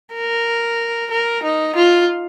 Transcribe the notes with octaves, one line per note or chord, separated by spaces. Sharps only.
A#4
A#4
D#4
F4